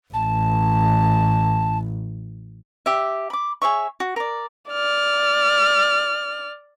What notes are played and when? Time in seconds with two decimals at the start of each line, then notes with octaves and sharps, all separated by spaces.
0.13 A1 A5
2.86 G4 E5
3.30 B5 D6
3.62 G#4 C#5 E5 C#6
4.00 F#4
4.16 A#4 D5
4.70 D5 F6